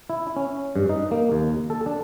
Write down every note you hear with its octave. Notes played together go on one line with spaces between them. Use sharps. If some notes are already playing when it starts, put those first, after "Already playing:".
E4
C#4
G2
D#4
A#3
D#2
A4
D4